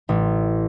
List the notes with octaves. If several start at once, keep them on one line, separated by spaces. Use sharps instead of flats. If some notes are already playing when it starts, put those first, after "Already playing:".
A1